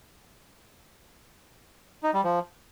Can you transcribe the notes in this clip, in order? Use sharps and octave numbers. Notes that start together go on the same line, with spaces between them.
D#4
G3
F3